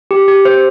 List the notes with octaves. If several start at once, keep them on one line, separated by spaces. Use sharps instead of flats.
G4
G4
C5